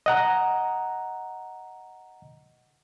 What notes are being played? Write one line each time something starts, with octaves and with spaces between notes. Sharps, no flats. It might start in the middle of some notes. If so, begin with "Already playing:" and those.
D#5 F#5 A#5